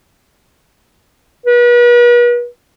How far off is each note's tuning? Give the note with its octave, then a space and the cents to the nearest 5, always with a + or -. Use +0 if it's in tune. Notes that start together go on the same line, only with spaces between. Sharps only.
B4 -40